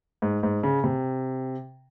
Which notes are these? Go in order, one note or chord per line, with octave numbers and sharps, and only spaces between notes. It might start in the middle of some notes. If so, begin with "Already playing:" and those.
G#2
G#2
C#3
C3